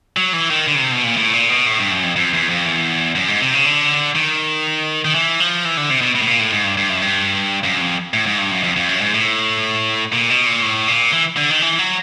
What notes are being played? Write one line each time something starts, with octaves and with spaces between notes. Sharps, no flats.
F#3
E3
D#3
D3
C#3
C3
B2
A#2
A2
A#2
B2
A2
G2
F#2
F2
F2
E2
F2
E2
F#2
G#2
C3
C#3
D3
D#3
D#3
E3
F3
E3
D3
C3
B2
B2
A2
A#2
A2
G#2
G2
G2
F#2
G2
F#2
F2
A2
G#2
G2
F#2
F2
F2
F#2
G#2
A2
A#2
B2
A#2
A2
A#2
E3
D3
D#3
E3
F#3